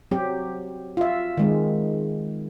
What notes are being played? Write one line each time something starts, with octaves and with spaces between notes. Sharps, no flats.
F#3 C4 G4
F4 E5
D#3 G#3 C4